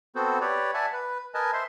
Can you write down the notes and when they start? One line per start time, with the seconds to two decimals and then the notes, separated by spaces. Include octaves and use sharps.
0.16 B3 C4 F#4 A4 C5
0.41 G4 B4 C#5 D5
0.74 D5 E5 F#5 G#5 A5
0.93 B4
1.34 A#4 B4 D#5 G#5 A5
1.53 C5 E5 C6